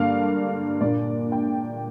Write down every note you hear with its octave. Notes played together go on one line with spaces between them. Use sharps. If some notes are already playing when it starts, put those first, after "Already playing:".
Already playing: G2 D3 A#3 D4 F5
A#2 A#3 D4 D5
G5